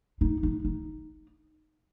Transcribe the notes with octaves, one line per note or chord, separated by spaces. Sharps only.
D#4
D#4
D#4